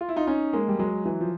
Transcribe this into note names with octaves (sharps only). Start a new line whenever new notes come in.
F4
E4
D#4 F4
C#4 D#4
G#3 A#3
G3
F#3 G#3
E3 F#3
F3